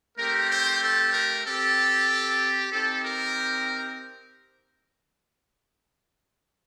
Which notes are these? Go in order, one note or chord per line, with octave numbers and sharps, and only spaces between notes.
A3 C4 G4 A#4
C5
A4
A#4
C4 G4 A4
C4 D#4 G4 A4
A#4